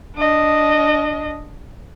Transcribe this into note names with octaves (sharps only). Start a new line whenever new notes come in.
D4 D#5